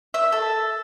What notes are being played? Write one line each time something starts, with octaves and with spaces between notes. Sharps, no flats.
E5
A4